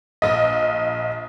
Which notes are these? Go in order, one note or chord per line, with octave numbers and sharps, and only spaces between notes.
A#1 D#5